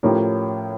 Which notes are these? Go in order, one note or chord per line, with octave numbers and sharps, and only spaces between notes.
A2 F3 C#4 G4 A#4